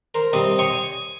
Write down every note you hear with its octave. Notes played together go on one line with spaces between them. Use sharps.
A#4 C5
C3 G3 C4 D#5
C#5 D#5 G5 C6 C#6
G#5